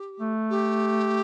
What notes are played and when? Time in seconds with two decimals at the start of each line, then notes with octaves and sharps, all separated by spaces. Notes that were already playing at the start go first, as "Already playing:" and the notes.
Already playing: G4
0.20 A3
0.50 G4